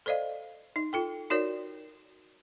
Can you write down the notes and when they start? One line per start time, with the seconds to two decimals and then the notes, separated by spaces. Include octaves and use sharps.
0.06 A4 C5 D5 D#5 F5
0.76 D#4
0.93 F4 A4 G5
1.30 D#4 F#4 A#4 C#5 D5